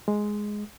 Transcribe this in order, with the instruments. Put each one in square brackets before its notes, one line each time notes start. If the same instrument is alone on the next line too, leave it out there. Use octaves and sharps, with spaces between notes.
[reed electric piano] G#3